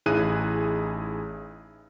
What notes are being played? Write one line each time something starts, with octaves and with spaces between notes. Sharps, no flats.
A1 D#4 E4 G#4 F#6 D#7